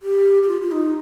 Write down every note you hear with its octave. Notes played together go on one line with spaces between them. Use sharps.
G4
G4
F4
F4
D#4